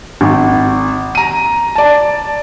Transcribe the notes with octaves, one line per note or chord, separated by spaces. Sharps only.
G#1
A#5 D#7
D5 A5